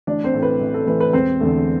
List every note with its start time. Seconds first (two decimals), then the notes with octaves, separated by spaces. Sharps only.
0.07 A1 D4 D5
0.24 C4 C5
0.34 A2 E3 A3
0.42 B4
0.61 A1
0.74 A4
0.86 A2 E3 A3 B4
1.00 B4
1.13 E1 C4 C5
1.40 E2 D3 A3